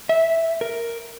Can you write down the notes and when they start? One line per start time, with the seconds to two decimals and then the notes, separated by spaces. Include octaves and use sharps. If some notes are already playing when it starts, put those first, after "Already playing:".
0.09 E5
0.61 A#4